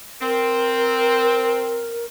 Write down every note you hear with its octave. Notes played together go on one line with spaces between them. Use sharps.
C4 A#4